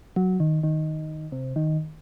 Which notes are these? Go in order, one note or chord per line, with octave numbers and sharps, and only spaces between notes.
F#3
D#3
D#3
C3
D#3